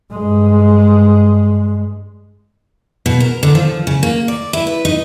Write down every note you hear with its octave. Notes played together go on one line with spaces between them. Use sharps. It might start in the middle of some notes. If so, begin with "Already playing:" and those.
G2 G#3
B2
A#4
D3
F3
C#3
A#3
D5
E4
B4
D#4